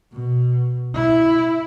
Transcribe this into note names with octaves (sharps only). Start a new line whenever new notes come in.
B2
E4